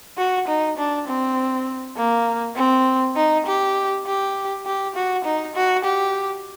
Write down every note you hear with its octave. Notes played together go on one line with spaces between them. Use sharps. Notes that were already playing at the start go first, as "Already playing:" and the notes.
F#4
D#4
D4
C4
A#3
C4
D#4
G4
G4
G4
F#4
D#4
F#4
G4